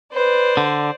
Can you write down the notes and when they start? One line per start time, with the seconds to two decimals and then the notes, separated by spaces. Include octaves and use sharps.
0.14 B4 C5 D5
0.57 D3